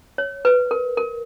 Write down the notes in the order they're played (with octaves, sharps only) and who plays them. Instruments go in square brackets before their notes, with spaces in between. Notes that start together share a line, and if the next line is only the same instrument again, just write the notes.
[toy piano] C#5
B4
A#4
A#4